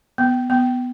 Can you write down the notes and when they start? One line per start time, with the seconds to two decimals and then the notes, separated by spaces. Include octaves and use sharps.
0.18 B3
0.50 B3